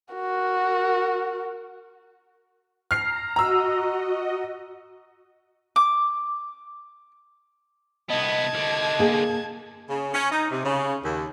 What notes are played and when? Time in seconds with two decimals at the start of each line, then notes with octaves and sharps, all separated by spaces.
0.14 F#4 A#4
2.91 A#5 F6 C7
3.36 F#4 D#5 A#5 E6
5.76 D6
8.10 C2 B3 D#5 A5 G#6
8.54 C2 D3
8.99 A#3 G#4
9.89 C#3
10.13 C#4
10.31 D#4
10.51 C3
10.65 C#3
11.03 D#2